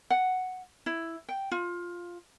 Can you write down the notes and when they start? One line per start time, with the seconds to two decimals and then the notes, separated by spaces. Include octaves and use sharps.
0.10 F#5
0.86 E4
1.28 G5
1.51 F4